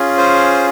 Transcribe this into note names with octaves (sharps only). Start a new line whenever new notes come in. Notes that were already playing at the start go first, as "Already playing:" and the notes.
Already playing: C#4 F4 G#4
C5